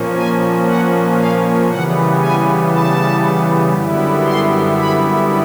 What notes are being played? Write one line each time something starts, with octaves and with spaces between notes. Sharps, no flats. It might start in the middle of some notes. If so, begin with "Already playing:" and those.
Already playing: A#2 F3 A#3 C#4
G#5
F#5
F5
C#3 E3 G3 B3 F#5
G#5
A5
F#2 D3 G3 B3 E4
C6
B5